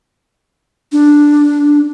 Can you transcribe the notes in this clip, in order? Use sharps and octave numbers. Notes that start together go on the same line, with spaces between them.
D4